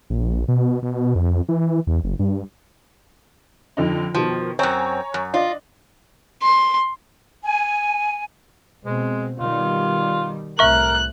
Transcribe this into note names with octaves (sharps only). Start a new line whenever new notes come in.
A#1
B2
B2
F2
E3
E2
F#1
G2
F2 D3 D#4
B2 D#3 F3
F#2 C4 C#5 G#5 A#5
F#2
D4 F4 D5 D#5
C6
G#5
B2 G#3 C4
B2 D#3 G3 F4
C2 A2 A#4 E5 C#6 F#6